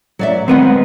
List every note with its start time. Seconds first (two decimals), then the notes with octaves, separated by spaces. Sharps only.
0.19 F#3 D5 E5
0.48 D#3 G#3 B3 C4 B4 F#5